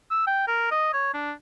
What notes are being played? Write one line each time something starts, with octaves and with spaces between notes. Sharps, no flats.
E6
G5
A#4
D#5
C#5
D4